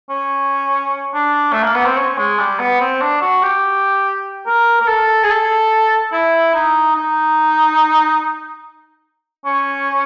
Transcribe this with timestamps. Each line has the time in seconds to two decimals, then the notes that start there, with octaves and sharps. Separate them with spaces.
0.10 C#4
1.14 D4
1.52 A3
1.63 A#3
1.75 B3
1.85 C4
1.97 C#4
2.18 G#3
2.39 G3
2.59 B3
2.80 C4
3.01 D4
3.21 F#4
3.43 G4
4.46 A#4
4.80 A#4
4.88 A4
5.23 G#4
5.30 A4
6.12 E4
6.54 D#4
6.95 D#4
9.45 C#4